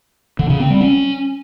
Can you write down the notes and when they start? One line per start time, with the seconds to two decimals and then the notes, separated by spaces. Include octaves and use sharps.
0.39 D3
0.50 C#3
0.60 C4
0.70 G3
0.81 C#4